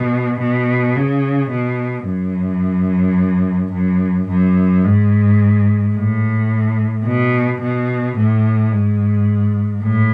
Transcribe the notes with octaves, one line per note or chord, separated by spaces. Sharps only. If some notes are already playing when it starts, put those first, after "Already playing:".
Already playing: B2
B2
C#3
B2
F#2
F#2
F#2
G#2
A2
B2
B2
A2
G#2
A2